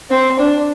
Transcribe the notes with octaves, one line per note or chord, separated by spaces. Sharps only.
C4
D4